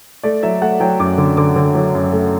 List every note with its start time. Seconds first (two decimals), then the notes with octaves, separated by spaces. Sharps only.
0.23 A3 D5
0.43 F#3 E5
0.61 A3 F#5
0.80 F#3 G5
0.99 F#2 D6
1.18 D3
1.37 D3 D6
1.56 D3
1.75 F#3
1.95 F#2
2.13 A3